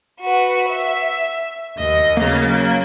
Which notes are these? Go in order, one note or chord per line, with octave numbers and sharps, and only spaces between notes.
F#4 B4
E5
D#2 D#5
C#3 F#3 A#3